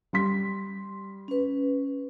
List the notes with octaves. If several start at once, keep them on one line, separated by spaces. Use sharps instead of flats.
G3 C6 B6
C#4 B4